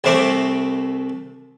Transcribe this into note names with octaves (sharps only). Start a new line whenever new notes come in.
C2 C3 A3 C4 D6